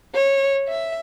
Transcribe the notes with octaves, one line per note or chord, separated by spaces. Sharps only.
C#5
E5